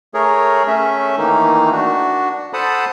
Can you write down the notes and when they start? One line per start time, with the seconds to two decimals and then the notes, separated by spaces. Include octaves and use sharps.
0.14 A3 G#4 A#4 C#5
0.67 A3 C#4 E5
1.18 D#3 E3 A3 A#3 D#4
1.72 D4 F#4
2.53 A4 C5 F#5 A5 B5 D#6